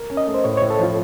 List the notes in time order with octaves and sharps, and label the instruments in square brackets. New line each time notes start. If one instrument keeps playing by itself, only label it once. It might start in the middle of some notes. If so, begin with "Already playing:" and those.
Already playing: [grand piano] A#4
C#4
[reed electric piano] D#5
[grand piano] A3
[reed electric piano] C5
[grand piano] A2 [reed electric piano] C#5
[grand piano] A2 [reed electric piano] C#5
[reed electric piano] A4
[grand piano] F3 [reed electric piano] F4